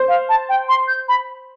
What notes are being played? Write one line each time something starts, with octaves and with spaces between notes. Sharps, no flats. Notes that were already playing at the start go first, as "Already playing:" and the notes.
Already playing: C5
F5
A5
G5
C6
G6
B5